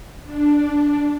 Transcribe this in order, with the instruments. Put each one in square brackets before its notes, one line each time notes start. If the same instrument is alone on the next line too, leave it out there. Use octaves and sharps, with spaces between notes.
[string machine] D4